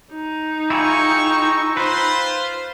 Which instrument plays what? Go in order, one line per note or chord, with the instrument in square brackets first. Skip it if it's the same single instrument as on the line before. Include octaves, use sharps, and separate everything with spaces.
[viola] D#4
[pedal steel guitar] E4 F4 G#4 [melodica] G5 A#5 E6 [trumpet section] C#6
[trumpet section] F4 C5 [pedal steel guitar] B4